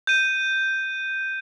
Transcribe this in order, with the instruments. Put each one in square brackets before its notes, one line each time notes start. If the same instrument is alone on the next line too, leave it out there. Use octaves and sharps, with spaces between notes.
[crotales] G6 D#7